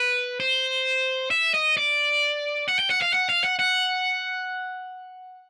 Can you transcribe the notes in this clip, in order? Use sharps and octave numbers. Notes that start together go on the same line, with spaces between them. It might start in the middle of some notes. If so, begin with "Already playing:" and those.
Already playing: B4
C5
E5
D#5
D5
F#5
G5
F#5
F5
F#5
F5
F#5
F#5